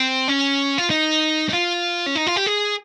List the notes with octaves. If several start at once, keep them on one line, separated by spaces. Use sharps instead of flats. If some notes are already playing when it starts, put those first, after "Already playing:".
Already playing: C4
C#4
F4
D#4
D#4
F4
C#4
D#4
F4
G4
G#4